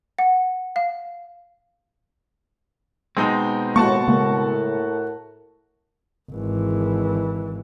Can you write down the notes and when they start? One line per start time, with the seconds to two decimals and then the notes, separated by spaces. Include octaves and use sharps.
0.19 F#5
0.76 F5
3.17 B2 G#3 C4 D#4
3.76 D#2 A2 G#3 A#3 F#4 A5 C#6
4.08 A2 C#3 G#3 A#3 A#4
6.31 G#1 E3